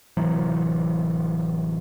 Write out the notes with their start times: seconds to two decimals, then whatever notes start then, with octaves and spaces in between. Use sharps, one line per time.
0.17 D1 C3 E3 F#3